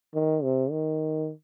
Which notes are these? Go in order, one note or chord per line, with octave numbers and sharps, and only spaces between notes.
D#3
C3
D#3